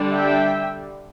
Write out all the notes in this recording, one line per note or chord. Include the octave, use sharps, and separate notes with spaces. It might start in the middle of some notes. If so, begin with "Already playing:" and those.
Already playing: D3 G3 D4
E5 G5